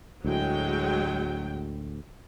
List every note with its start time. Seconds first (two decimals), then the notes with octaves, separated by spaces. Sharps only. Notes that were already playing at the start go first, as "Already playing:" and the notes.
0.25 D2 A2 F#3 G#3 G5